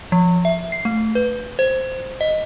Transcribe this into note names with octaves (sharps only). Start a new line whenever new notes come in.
F3
E5
C7
A3
B4
C5
D#5